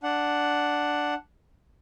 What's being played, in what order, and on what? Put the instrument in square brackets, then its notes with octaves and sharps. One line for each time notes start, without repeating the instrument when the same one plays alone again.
[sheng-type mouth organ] D4 F#5